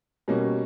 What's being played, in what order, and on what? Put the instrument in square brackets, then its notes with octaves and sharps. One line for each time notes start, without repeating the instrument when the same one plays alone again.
[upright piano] B2 G3 A#3 C#4